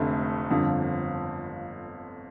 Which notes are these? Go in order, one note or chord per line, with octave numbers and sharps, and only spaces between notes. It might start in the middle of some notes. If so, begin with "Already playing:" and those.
Already playing: F1 F2 D3 A3
G1 F2 D3 F3